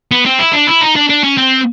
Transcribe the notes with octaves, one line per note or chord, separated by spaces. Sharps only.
B3
C4
E4
D4
E4
D#4
D4
D4
C#4
C4